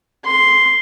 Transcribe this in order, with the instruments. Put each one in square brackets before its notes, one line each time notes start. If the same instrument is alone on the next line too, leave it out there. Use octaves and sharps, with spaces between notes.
[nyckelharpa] C6